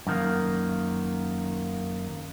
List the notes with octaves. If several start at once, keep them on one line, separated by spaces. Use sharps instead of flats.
F#2 D#3 A#3